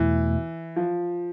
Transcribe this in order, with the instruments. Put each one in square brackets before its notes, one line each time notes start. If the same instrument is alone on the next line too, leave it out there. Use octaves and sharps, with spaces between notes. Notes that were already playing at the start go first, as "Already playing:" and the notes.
Already playing: [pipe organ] E2 B2 A3 [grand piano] E3
[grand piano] F3